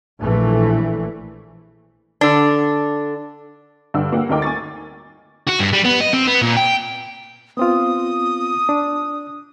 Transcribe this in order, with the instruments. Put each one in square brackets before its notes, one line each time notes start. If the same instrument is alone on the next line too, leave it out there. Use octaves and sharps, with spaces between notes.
[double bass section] A#1 E3 A3
[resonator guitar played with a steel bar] D3 D4
[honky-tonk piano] G2 D3 G4 E6
A#3 F#5 G5
D2 A3 D#4 A#4 G5 D6
G#5 C#6 A6
[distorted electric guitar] F#4
G2
G3
B3
D#5
C4
B3
A#2
G5
[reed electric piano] B3 C4 F4 [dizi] D#6
[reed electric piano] D4